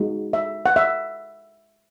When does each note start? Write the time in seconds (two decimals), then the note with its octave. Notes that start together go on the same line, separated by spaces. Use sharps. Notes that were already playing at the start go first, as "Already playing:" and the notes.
Already playing: G#3 D#4 F#4
0.33 E5
0.66 F#5
0.76 E5